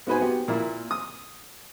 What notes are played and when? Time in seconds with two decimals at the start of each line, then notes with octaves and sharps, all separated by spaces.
0.07 G#2 B3 F#4 B4 C5 G#5
0.21 B3 F#4 G4
0.48 A#2 A#3 E4
0.91 D#6